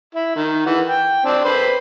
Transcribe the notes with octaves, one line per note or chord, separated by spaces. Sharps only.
E4
D#3
E3 F#5
G5
C4 D4
B4 C5 B5